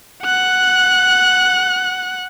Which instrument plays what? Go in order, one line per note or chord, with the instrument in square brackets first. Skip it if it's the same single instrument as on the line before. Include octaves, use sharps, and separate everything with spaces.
[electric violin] F#5 F#6